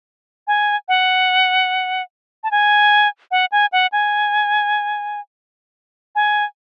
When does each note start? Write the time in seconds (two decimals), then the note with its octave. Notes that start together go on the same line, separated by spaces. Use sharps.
0.48 G#5
0.88 F#5
2.44 A5
2.51 G#5
3.31 F#5
3.52 G#5
3.72 F#5
3.92 G#5
6.15 G#5